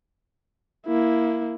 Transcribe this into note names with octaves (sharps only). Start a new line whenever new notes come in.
A#3 E4